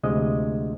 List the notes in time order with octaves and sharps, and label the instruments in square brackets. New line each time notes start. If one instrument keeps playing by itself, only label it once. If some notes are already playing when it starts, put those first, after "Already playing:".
[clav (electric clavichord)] D2 C3 F3 G#3 D#5